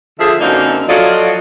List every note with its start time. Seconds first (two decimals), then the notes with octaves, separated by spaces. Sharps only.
0.19 D3 F3 G#4 E5
0.40 F#2 D3 A#3 C4 D4 D#4
0.88 F3 F#3 F4 A4 D5 D#5